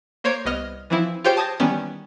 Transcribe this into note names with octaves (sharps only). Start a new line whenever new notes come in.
A#3 C5 C#5 G#6 C7 D7
C2 B3 D#5 F6
E3 F3 C4 E4
F4 G4 G#4 C5 C#5 G5
A5 D#6 G#6 A#6
D#3 E3 G3 B3 C#4